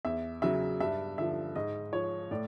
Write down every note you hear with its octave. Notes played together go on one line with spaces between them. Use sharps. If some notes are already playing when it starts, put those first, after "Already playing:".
E2 E5
C#3 F#3 E5
G2 E5
D3 F3 E5
G#2 D#5
F3 C#5
A2 D5